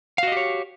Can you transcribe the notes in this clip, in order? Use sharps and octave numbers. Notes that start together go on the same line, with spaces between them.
F#4 G4 C#5 D#5 F5